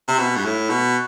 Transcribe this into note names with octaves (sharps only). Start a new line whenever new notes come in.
C3
B2
G2
A2
B2